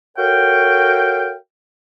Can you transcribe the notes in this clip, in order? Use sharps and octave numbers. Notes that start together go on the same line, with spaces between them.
F#4 A4 A#4 C#5 F5 G5